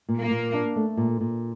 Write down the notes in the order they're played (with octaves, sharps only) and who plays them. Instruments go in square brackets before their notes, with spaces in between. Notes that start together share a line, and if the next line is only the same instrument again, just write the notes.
[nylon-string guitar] A#2
[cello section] A#3
[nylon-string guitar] A#2
D4
A3
A#2
A#2